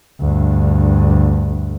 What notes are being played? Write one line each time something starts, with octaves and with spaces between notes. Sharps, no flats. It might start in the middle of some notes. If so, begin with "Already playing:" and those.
D2 G2